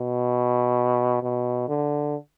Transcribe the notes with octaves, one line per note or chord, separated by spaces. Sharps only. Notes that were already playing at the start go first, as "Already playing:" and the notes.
Already playing: B2
B2
D3